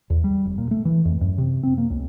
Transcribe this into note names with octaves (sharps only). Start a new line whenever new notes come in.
E2
G3
F1
A#2
A3
E3
F2
F#2
C3
C4
A#3
C#2